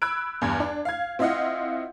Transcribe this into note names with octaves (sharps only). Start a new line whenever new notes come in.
B5 E6 F#6 G#6 D7
E2 G2 G#6
D4
F5 G#6
C4 E4 F4 D#5 F5 F#5